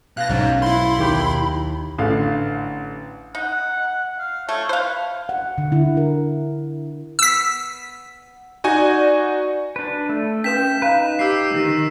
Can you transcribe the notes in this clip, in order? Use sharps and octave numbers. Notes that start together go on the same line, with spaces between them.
B2 F5 F#6 A6 A#6
B1 G#2 F#3 C#4 F#4
E4 B5 C6
D#2 G4
A1 D3 F5
D#4 F#5
F5
A3 C#5
B4 C5 F5
F#5
D3
E4
A#4
B3 E6 B6
D#4 F#4 D5 G#5
D4 B4
A3 A4
C#4 B4 G5 D#6 B6 E7
D#4 B4 F5 A#5
G4 E6 C7
D#3